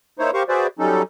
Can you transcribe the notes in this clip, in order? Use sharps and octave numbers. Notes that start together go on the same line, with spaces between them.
A#3 D#4 E4 C5 C#5
G4 A#4 C5 F5 C#6
F#4 G#4 B4 C5 D5 E5
F#3 G3 C#4 D#4 A4